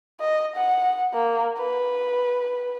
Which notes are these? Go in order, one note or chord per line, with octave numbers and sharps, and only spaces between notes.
D#5
F#5
A#3
B4